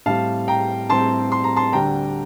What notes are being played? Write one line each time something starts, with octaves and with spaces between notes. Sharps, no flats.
A2 G3 C4 F5 A5
G5 A#5
A2 G3 C4 A5 C6
C6
A#5
A5 C6
D2 D3 G3 D4 G5 A#5